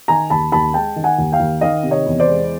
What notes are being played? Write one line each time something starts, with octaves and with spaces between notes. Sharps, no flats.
D#3 G#5 A#5
D#2 A5 B5
D#2 A5 B5
G#3 G5 A5
D#3
F#5 G#5
D#2
F5 G5
D#2
D#3 D#5 F5
C3
C#5 D#5
E2
C5 D5
G#3